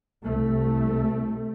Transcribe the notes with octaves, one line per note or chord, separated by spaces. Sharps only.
C2 A3